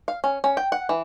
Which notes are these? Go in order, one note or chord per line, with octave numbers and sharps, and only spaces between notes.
F5
C#4
C#4
G5
F#5
E3